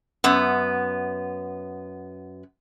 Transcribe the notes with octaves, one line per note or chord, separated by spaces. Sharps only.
F#2 B3